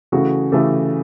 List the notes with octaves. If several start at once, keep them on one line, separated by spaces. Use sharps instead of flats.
C#3 E3 A3 F#4 G#4
C#3 E3 A3 G4 A4